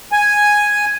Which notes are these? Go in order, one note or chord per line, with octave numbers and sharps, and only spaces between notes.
G#5